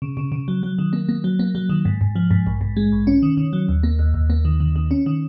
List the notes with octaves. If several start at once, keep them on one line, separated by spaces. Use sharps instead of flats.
C#3
C#3
C#3
F#3
F#3
D#3
A#3
A#3
F#3
A#3
F#3
D#3
G#2
G#2
F3
G#2
A#1
G#2
G#3
A#1
C#4
D#3
D#3
F#3
D#2
A#3
D#2
D#2
A#3
D#3
D#3
D#3
C#4
D#3